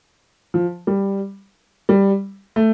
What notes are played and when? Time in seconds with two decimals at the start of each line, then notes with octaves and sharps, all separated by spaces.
0.54 F3
0.87 G3
1.89 G3
2.56 A3